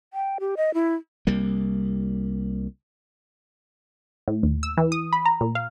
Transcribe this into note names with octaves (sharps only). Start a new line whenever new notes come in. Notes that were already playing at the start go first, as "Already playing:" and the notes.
G5
G4
D#5
E4
C2 G3 A#3
A2
D#2
E6
E3
D#6
B5
A#5
A#2
F5